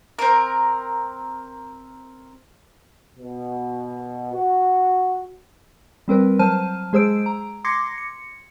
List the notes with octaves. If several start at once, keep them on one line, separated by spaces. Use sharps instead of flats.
C4 A#4
B2
F#4
G3 C4 A#4 B4
F#3 C5 A5 F6 D#7
G#3 G#4 C5 E6 D7
A#5
C6 D6 G#6 A#6 C7 C#7
C#7